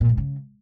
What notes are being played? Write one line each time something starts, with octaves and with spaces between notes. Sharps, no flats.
A#2
G#2
C#3